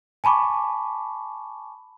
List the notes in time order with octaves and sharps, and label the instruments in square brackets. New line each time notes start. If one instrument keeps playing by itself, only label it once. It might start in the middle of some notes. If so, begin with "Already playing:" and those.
[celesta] G#5 A5 B5 C#6 D6